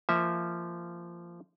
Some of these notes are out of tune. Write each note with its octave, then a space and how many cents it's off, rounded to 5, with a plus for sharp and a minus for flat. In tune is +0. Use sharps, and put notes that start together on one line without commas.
F3 -20 A#3 -15 E5 -15